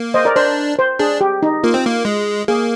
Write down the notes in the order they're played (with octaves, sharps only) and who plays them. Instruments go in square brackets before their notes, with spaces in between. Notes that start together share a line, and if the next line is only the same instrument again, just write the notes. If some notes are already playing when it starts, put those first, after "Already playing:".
Already playing: [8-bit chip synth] A#3
[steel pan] C5 D#5
A#4 D5
[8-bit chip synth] D4 [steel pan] C5
[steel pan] C5
[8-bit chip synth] D4 [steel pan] G#4
[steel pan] G4
D#4
[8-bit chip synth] A#3 [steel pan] F4
[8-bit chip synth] C4
A#3
G#3
[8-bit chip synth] A#3 [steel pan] G#4